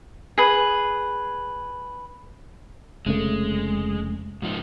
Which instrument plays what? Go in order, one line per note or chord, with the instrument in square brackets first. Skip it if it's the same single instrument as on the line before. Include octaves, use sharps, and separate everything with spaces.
[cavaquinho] G#4 B4
[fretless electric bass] F1 C#3 A3 [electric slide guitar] G#3
[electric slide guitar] G#2 F3 D#4